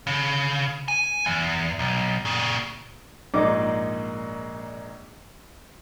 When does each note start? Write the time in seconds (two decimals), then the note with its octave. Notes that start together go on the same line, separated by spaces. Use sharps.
0.07 C#3
0.88 G#5
1.26 E2
1.79 B1
2.25 A#2 C#3
3.34 A#1 G#2 D#4 D5 D#5 D6